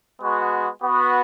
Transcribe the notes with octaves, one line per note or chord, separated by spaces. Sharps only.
G#3 B3 F#4
B3 F#4